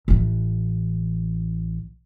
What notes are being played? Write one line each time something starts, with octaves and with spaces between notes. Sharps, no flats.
A1 E3